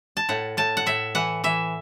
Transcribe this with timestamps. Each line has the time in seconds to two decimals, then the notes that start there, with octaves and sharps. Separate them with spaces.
0.17 A5
0.29 A2 F#5
0.57 A2 A5
0.77 F#5
0.86 A2 E5
1.15 E3 F#5
1.44 E3 E5